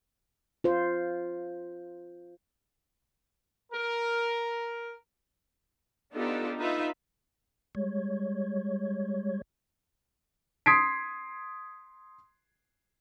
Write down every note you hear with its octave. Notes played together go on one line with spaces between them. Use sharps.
F4 C5
A#4
B3 D4 D#4 F4 G4 A4
D#4 F4 B4 E5
G3 G#3 C#5
C6 D#6 G#6 B6 C7 D7